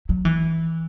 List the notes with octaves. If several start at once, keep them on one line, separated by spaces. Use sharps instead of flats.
F#3
E3